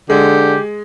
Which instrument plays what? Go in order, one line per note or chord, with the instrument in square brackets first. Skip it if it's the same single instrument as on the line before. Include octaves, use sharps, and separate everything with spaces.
[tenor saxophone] D3 [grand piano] G#3 [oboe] G4